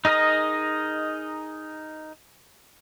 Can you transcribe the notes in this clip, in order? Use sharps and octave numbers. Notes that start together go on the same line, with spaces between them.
D#4 G#4 A#4 D#5 A#5